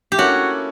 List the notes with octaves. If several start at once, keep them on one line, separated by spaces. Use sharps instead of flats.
G4
A#3 C#4 E4 F#4 A4 C#5